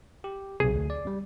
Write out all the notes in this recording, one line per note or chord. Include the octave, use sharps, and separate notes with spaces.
G4
B1 C3 G#4
D2
D5
G3